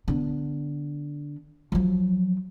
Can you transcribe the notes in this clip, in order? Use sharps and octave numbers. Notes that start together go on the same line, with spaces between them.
D3 B3
F3 F#3